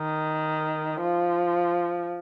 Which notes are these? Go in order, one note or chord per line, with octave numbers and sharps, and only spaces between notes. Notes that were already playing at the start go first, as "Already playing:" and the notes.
Already playing: D#3
F3